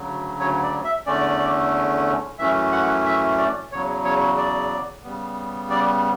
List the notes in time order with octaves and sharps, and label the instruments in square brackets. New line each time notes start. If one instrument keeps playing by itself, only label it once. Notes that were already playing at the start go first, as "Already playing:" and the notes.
Already playing: [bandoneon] D2 C#3 F#3
C#5
D5
E5
E2 D3 A3 C#4 D5
F#2 E3 A3 C#4 E5
F#5
E5
D5
E2 C#3 F#3 C#5
C#5
D5
C#3 G3 B3
D5